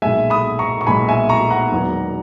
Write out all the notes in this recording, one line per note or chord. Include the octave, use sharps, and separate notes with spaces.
B1 A#2 G#3 E5 G#5
B5 D#6
A#5 C#6
C#6
B1 A#2 G#3 G#5 B5
E5 G#5
A#5 C#6
F#5 A#5
E1 E2 D#3 F#3 A#3